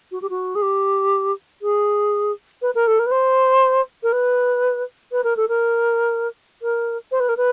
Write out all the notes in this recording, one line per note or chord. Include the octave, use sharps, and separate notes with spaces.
F#4
G4
F#4
G#4
G4
G#4
B4
A#4
A4
A#4
B4
C5
A#4
B4
B4
A#4
A4
A#4
A#4
C5
B4
A#4
B4